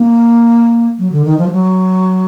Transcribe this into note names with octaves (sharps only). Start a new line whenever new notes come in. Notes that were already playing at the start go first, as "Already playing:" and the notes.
Already playing: A#3
F#3
D3
D#3
F3
G3
F#3